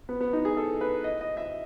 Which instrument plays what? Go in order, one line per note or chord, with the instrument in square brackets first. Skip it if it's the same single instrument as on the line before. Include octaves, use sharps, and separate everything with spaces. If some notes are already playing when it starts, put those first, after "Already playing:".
[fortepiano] B3
B3
D#4
G#4
A4
B4
D#5
D#5
E5